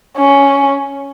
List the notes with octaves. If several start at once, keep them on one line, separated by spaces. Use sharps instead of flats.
C#4